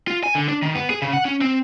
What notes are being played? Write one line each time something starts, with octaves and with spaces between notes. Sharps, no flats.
F4
G#5
D3
D4
D#3
B3
G#4
C#3
F#5
C#4
C4